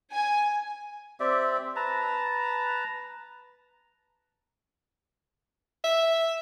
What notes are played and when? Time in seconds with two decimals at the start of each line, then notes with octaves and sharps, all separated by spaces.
0.11 G#5
1.20 C4 G4 D5 E5
1.76 B4 A5 A#5
5.84 E5